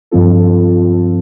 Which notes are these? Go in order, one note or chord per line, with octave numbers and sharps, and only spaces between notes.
G2 F3 C4 F4 A4